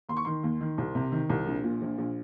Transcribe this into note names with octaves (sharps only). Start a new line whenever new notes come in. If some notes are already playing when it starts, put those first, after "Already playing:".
D#2 C6
C#6
D#3 C6
D#2
D#3
C2
C3
D#3
C2
A#1
A#2
A#1
A#1